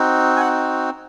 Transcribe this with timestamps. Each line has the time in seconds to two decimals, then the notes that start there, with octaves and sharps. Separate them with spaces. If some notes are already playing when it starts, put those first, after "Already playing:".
Already playing: C4 D#4 F#4
0.37 G#5
0.40 F#5